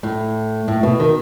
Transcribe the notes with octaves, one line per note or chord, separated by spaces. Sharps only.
A2
A2
B2
D#3